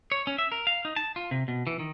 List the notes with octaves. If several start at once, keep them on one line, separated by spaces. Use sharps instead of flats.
C#5
C#4
E5
A#4
F5
D#4
A5
F4
C3
B2
E3
D#3